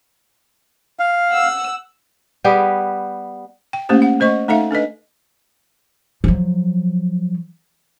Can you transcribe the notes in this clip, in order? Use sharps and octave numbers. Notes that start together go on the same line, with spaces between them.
F5
F#5 E6
G3 B3 G4 G#4
G5
A3 A#3 C#4 G4 C5
F#5
A3 C5 D#5 C#6
A3 D#4 A4 E5 F5
D4 A4 B4 D#5
F3 F#3